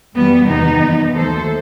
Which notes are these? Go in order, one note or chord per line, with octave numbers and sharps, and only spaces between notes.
F#2 E3 G3 B3
E2 C3 D#3 B3 D#4
F#2 E3 G3
D#2 D#3 F#3 A3 A4 C5